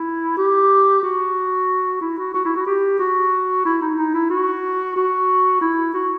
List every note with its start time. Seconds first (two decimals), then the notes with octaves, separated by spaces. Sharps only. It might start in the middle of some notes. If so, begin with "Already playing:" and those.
Already playing: E4
0.37 G4
1.03 F#4
2.01 E4
2.18 F#4
2.34 F#4
2.45 E4
2.56 F#4
2.67 G4
2.99 F#4
3.65 E4
3.81 D#4
3.97 D#4
4.14 E4
4.30 F#4
4.96 F#4
5.61 E4
5.94 F#4